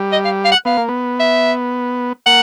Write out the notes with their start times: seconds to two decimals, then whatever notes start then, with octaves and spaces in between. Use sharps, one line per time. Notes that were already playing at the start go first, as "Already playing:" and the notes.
Already playing: G3
0.12 D#5
0.24 F5
0.45 F5
0.51 F#5
0.65 B3 F5
0.77 A#3
0.89 B3
1.20 E5
2.26 A#3 F#5